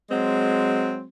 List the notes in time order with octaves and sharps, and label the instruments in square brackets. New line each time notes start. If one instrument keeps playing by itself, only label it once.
[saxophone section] F#3 G#3 C4